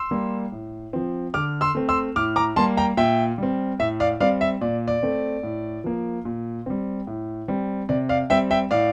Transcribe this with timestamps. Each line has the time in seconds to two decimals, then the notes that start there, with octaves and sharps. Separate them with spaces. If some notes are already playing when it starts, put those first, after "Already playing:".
Already playing: C6 E6
0.11 G3 A#3
0.52 A2
0.93 F3 C4
1.34 D3 D6 F6
1.61 C6 E6
1.75 A3 C4
1.89 C6 E6
2.16 A2 D6 F6
2.36 A#5 D6
2.56 G3 A#3 A5 C6
2.77 G5 A#5
2.97 A#2 E5 G5
3.38 G3 C4
3.79 A2 E5
4.00 D5 F5
4.20 G3 C4 D5 F5
4.41 E5
4.61 A#2 D5
4.88 D5
5.03 A3 C4
5.43 A2
5.84 F3 A#3
6.25 A#2
6.66 G3 C4
7.07 A2
7.48 G3 C4
7.89 C3 D5
8.09 D5 F5
8.30 G3 C4 E5 G5
8.51 E5 G5
8.71 A2 D5 F5